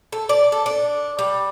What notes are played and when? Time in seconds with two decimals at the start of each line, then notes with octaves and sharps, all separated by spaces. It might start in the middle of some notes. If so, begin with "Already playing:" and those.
0.12 A4
0.29 D5
0.52 A4
0.66 D4
1.19 G3